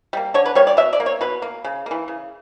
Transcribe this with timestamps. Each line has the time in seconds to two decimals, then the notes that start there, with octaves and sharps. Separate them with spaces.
0.13 G3 A#3
0.34 D3 C#5
0.46 B4
0.55 G3 A#3 C#5
0.67 D5
0.77 B2 E5
0.93 D5
1.00 A#3
1.06 C#5
1.21 B2 B4
1.42 A#3
1.64 C#3
1.86 E3 A#3
2.08 C#3